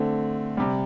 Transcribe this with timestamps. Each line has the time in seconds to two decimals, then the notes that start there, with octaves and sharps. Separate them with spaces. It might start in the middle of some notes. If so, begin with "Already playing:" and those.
Already playing: D3 A3 C4
0.57 C3 G3